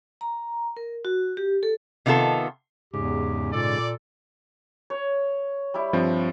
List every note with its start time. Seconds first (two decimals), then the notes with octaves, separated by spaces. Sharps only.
0.21 A#5
0.77 A#4
1.05 F#4
1.37 G4
1.63 A4
2.06 C3 D#3 B3 F4 A4
2.94 E2 G#2 C#3 G4
3.53 A#2 A4 D5
4.90 C#5
5.74 G3 E4
5.93 G2 F3 C4